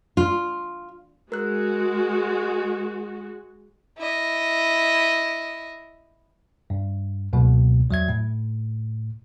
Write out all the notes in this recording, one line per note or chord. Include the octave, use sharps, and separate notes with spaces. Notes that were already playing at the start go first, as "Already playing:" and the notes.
F4
G#3 F#4 A#4 F#6
E4 D#5
G2
C#2 G#2 B2 F#3 A#3
E2 F#3 E5 G#6
A2